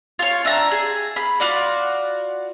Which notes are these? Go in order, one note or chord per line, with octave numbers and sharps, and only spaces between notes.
F4 C#5
D4 E5 G5 A#5
G#4
B5
F4 F#4 D5